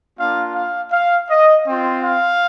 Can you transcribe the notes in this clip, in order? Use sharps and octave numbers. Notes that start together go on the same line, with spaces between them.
A#3 D4 F4 F5
F5
F5
D#5
C4 F4
F5